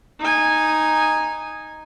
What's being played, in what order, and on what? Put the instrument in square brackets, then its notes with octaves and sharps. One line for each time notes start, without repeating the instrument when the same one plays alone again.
[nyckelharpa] D#4 G#5